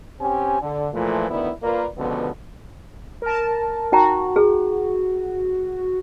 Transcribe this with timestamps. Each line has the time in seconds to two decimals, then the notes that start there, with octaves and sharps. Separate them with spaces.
0.21 C4 C#4 G4 G#5
0.62 D3
0.94 A#2 E3 F3 A3
1.30 D2 D#3 B3 E4 D5
1.63 A#3 F4 A#4 B4 D5
1.98 C#2 B2 D3 F3 B3
3.22 A#4 A5
3.92 D#4 F#4 G5 A#5
4.36 G#4